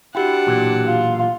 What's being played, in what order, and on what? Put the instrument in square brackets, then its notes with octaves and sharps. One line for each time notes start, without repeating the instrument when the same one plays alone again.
[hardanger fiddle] D4 F#5 [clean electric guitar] E4 [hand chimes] F#4 G4 G5
[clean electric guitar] B1 A#2 E3
[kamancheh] F4